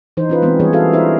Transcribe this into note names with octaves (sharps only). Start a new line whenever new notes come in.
E3 D#4 C5
C#4 F4 B4
E3 G#3 B3 C4 D4
E3 G3 A#3 G#4 C#5
E4 F#4 G#4 A4 E5 F5
D4 E4 A#4 C5 E5